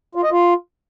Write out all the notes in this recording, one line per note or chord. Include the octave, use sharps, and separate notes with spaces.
F4
D#5
F4